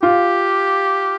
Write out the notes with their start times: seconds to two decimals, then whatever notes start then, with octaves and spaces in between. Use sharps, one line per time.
0.02 F4 G4